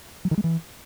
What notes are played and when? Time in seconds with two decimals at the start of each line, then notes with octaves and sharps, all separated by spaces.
0.25 F#3
0.31 D#3
0.38 G#3
0.44 E3